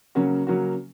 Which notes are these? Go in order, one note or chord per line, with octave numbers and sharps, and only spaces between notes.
C#3 F#3 A#3 C#4 F#4
C#3 F#3 A#3 C#4 F#4